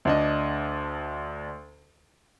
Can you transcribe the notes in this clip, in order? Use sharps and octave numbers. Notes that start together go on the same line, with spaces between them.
D2 D4 D#5